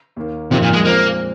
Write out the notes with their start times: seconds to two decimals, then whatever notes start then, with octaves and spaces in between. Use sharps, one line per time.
0.16 D#2 D#3 A#3
0.51 F2 C3 F3 A#3 D#4
0.62 A#2
0.73 G#3
0.85 A#2 G#3 A#3 C4